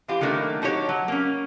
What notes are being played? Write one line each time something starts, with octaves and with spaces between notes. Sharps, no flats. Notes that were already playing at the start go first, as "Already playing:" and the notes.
E3 F4 G4
D#3 F#3 A3 A#3 D4
D4 D#4 F#4 G4 C#5
F#3
A#3 C#4